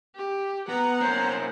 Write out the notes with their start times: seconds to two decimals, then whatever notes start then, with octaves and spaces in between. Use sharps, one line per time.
0.15 G4
0.69 B3 F#5 A#5
1.01 A#3 C#4 C5